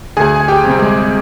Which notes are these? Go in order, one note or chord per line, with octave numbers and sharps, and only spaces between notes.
D2 G#4 G#5
G#5
G4 G5
C3 G3 C4
G#3 G#4